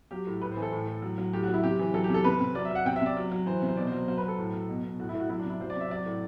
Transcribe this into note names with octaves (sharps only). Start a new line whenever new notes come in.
F#3 G4
A2
A2 B4
C5
E3
A4
A2
A2
F#3
F#3
A2 G4
F#4
F#3
E4
C3 G4
E3
F#3 A4
G4
C3 A4
C3 B4
C3
F#3 D5
E5
F#3 F#5
C3 G5
E5
C3 D5
F#3
F#3
E3 C5
C3
C5
B2 D5
C5
F#3
F#3 C5
B4
F#3
A4
A2
F#3
B2
B2
A2 F#4
E4
A2
F#4
F#3 E4
D4
C3 E4
F#3 C5
D5
C3 E5
E5
F#3 D5
A2